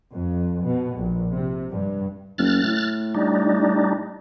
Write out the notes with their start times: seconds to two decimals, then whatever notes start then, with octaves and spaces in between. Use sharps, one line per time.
0.12 F2
0.65 B2
0.97 A#1
1.31 C3
1.70 G2
2.38 F#1 F6 F#6 A6
2.63 A2
3.15 G3 D4 D#4